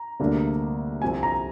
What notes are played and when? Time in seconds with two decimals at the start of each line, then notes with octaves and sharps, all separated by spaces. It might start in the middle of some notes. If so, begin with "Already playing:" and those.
Already playing: A#5
0.20 D2 C3 G3 A#3 D4
1.02 C2 C3 F3 C4 G#5
1.23 A#5